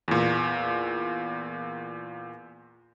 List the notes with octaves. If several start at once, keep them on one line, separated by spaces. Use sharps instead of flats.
E2 A#2